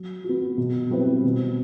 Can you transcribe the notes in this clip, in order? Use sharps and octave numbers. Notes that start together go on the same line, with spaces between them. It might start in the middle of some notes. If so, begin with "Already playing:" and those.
Already playing: F#3
F#4
B3
B2
G3 C4 E4 B4
B2